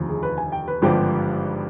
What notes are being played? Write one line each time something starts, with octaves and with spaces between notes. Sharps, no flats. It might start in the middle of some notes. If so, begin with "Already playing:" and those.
Already playing: F1 D#2 D3 F3
G#4
B4
G#5
G5
B4
G#1 G2 D3 F3 G4